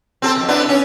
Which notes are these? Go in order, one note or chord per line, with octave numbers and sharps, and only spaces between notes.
C4 G#4 A4
F2
B3 D4 E4
C#4